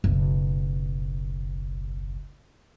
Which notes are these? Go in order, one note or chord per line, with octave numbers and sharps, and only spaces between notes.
F#1 B1